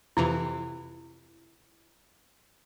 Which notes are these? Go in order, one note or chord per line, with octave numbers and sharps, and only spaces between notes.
F2 C3 E3 E4